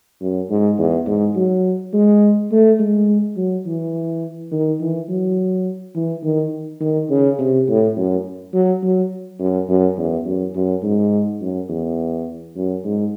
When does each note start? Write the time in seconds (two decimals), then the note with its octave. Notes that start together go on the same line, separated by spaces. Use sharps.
0.21 F#2
0.50 G#2
0.78 E2
1.07 G#2
1.36 F#3
1.93 G#3
2.51 A3
2.79 G#3
3.37 F#3
3.66 E3
4.52 D#3
4.81 E3
5.09 F#3
5.95 E3
6.23 D#3
6.81 D#3
7.10 C#3
7.39 C3
7.68 A2
7.96 F#2
8.53 F#3
8.83 F#3
9.40 F#2
9.68 F#2
9.97 E2
10.25 F#2
10.55 F#2
10.83 G#2
11.41 F#2
11.69 E2
12.56 F#2
12.84 G#2